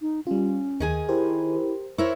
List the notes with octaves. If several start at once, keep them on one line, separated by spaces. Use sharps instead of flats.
D#4
G3 C#4 F4
D#2 D#3 G#4 G#5
E4 G4 A#4 C5
E4 A#4 C5 C#5 C#6 E6